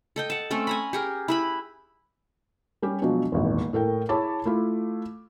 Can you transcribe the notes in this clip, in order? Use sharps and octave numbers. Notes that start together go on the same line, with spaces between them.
A4 D#5 G5
F#5 A5
A3 C4 C#4 A4
G#5 A#5 B5
G4 G#4 A#4
E4 B4 B5
G3 C#4 G4
B2 F3 F#3 G#3 D4
D#1 G#1 E2
A2 A4 A#4 G5
E4 G#4 C#5 A5 B5 D6
A3 E4 F4